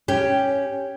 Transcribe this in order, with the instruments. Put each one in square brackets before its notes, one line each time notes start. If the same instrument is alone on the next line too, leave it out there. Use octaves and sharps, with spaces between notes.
[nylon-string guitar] C#4 G4